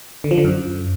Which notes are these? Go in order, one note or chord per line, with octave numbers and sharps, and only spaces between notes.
D3
F3
D3
F#2